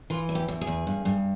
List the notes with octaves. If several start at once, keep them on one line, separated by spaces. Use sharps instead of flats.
E3 F4
E2
G4
E2
G#4
E2
G2
G2